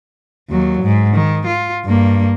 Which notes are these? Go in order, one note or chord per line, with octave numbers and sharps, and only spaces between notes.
D#2 F#3
G#2
D#3
F4
G2 A#3